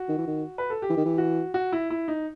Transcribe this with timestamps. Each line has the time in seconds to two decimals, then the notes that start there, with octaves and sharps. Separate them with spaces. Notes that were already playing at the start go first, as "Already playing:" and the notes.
Already playing: F#4
0.09 D#3
0.18 E3
0.27 D#3
0.58 B4
0.70 A4
0.82 G4
0.90 E3
0.97 D#3
1.05 E3
1.18 F#4
1.54 F#4
1.72 E4
1.90 E4
2.08 D#4